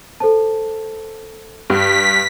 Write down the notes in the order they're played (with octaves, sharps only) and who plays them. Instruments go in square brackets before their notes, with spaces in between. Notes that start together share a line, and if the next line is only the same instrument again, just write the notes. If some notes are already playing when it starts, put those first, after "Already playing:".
[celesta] A4 C5 A5
[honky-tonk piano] G2 [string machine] B6